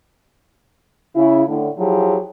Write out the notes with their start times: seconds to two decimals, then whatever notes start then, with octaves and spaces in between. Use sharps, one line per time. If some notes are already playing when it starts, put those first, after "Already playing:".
1.15 C#3 E4
1.47 A2 D3
1.78 F3 F#3 E4 G4 G#4